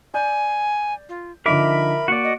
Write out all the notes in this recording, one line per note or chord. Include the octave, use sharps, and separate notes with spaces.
D5 G#5 G6
F4
D3 F3 D#4 A#4 E5 B5 D6
A#3 F#4 D5
D#5